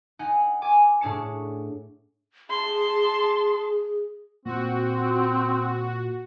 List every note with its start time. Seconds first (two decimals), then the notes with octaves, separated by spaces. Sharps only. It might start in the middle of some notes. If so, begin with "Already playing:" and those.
0.19 D#4 F#5 G#5
0.62 G#5 D6 D#7
1.01 A2 D4 G#4 A5 C#7
2.50 G#4 A5 C6
4.45 A#2 C4 F#4